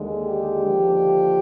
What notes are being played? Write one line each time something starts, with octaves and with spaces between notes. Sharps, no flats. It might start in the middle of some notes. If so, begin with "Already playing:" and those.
Already playing: D#2 D3 G#3
G4
D#2 D3 F3